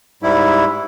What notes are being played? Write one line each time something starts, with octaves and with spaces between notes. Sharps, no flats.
G#2 G3 E4